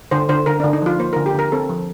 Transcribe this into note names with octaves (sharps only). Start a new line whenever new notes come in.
D3 C5
D3 C5
D3 A#4
D3 D4
D#4
F3 F4
A#3 C5
D3 A#4
G4
D3 A#4
C4 A4
F3